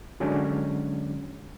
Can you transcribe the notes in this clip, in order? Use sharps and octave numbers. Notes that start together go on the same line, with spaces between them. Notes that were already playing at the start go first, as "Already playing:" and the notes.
D3 F#3 G#3 C#4 D4